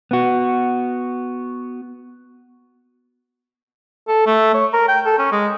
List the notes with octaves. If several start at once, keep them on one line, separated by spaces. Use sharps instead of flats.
B3 F#4
A4
A3
C#5
A#4
G5
A4
C#4
G#3